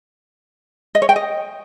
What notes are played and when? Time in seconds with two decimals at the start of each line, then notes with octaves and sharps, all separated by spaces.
0.95 D#5
1.02 C#5
1.09 G5
1.16 D#5